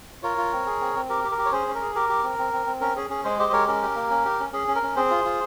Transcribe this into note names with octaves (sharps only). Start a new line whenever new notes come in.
F4 A#4 C#5
F4
C4
G#4
C4
C4
G4 A#4
G4
A#4
G4
C#5
C#4 G#4 C5
C#4
A#4
G#4
G4 A#4
G4
C4
C4
C4
C4
C#4 A#4
C#4 G#4
C#4 G#4
G#3 G#4 C5
G4 C5 D#5
G#3 A#4 C#5
C#4 A#4
G4
A#3
C#4
G4
C#4
C#4 G#4
C#4
A#4
C#4
C4 G#4 C5
F4
F4